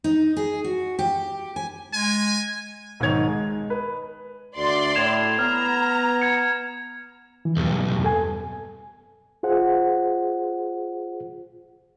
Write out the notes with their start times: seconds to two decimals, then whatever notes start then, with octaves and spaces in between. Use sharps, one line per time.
0.04 D#4
0.37 G#4
0.64 F#4
0.99 G4
1.56 G#5
1.93 G#3 G#5
3.00 B1 G#2 D#3 C#5 G#6 F7
3.27 G#3
3.70 B4
4.57 D2 D5 C6
4.95 A2 G#6 E7 F7
5.39 B3 A#5 F6
6.22 G#6 C#7
7.45 E3
7.57 B1 E2 G2
8.04 A4 G#5
9.43 F4 G#4 C5 F#5